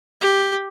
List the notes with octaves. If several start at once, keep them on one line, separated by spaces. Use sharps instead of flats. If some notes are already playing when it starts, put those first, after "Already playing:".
G4